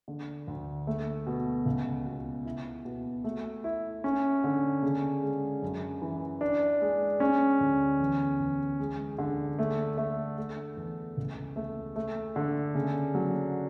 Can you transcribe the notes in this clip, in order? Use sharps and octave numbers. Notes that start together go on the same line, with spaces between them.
D3
D2
A3
B2
C#2
B2
E4
B2
A3
E4
C#4
D3
C#3
G#3
F#2
E3
D4
G#3
C#4
D2
E2
E2
G#3
D3
A3
A3
A3
E2
C#2
A3
A3
D3
C#3
F#3